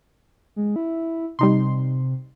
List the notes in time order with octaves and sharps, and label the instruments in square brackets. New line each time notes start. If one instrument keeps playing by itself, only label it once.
[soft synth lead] G#3
E4
[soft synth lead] C3 [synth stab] G3 D#4 C6